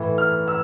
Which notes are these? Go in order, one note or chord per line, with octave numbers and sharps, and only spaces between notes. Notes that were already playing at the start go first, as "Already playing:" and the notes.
Already playing: A2 E3
F6
E6